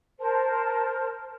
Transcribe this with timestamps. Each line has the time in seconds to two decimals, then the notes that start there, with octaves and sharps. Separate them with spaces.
0.20 A#4 C5 A5